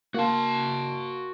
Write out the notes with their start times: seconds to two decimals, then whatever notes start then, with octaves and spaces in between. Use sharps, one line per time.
0.14 A#3 F#4 A#4 F5 A5 C6